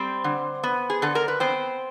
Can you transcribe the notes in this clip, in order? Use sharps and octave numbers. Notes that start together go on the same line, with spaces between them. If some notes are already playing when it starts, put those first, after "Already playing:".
Already playing: G3 C4 C5
D3
B3
G#4
D3 A4
A#4
B4
B3 C4 C5